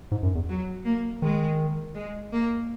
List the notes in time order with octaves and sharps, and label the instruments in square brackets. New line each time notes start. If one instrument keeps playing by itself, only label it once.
[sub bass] G#2
F#2
E2
[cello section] F#3
A#3
[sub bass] D#3 [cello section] G#3
[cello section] G#3
A#3